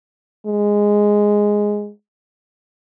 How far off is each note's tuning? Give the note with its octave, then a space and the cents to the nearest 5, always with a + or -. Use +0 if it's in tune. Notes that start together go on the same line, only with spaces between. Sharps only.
G#3 -5